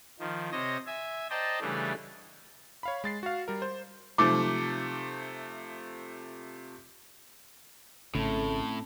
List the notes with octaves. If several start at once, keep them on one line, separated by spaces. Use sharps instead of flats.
D#3 F3
C3 C5 C#5 D#5 A#6
E5 G#5
C5 D5 D#5 G5 A5 A#5
C#3 E3 G3 A3 D4
C#5 F5 B5
G#3 A6 C7
F#4 F5
G3 A#4
C5
C3 F3 A3 D#4 C#6 D6
G#1 A2 C#3 A3 C4 C#4 A5